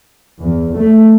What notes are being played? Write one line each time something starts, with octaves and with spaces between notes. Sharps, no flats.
E2
A3